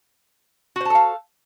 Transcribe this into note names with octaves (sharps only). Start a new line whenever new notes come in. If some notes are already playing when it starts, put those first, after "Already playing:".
F#4 A4 C5 F5 A5